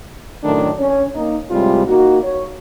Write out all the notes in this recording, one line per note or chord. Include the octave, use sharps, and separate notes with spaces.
F#2 A2 D#3 A3 D4
C#4
A#3 D#4
A2 C3 G3 G#3 F4
A#3 D#4 F#4
C#5